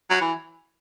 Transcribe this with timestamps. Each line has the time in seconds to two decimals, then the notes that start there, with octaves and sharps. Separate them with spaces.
0.10 F#3
0.21 E3